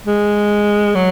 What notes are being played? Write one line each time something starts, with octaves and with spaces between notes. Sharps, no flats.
G#3
F#3